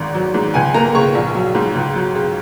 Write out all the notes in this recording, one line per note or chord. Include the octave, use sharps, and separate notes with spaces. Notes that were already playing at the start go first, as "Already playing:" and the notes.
Already playing: G#1 G#2
F#3
G#2
C#2 G#5
A#3 A#5
C#3 C#6
A#1
F#3
G#2
C#2
F#3
C#3